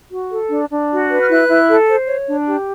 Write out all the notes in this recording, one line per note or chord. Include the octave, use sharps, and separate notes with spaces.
F#4
A4
D4
D4
F#4
B4
F6
E4 F#6
E4
A4
C5
C#5
D4
G4